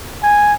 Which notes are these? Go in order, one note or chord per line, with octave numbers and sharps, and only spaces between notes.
G#5